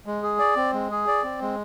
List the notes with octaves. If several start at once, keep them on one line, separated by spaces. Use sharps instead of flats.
G#3
G#4
D5
C4
G#3
G#4
D5
C4
G#3